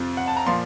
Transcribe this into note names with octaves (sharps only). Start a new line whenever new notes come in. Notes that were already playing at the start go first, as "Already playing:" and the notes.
Already playing: F2 C3 F3
F#5
A5
A#5
A#2 F3 C6